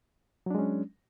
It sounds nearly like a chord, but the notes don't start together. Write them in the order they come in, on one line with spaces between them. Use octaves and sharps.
F#3 D4 G#3 C#4